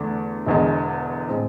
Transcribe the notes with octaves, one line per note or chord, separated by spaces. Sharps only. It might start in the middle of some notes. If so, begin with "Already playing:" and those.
Already playing: E2 D3 A3 D4
E1 E2 D3 G#3
A2 G#3 C4